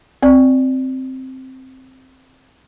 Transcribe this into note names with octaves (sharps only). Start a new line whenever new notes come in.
C4 D5